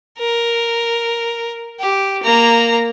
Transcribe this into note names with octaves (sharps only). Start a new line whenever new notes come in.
A#4
G4
A#3 A#5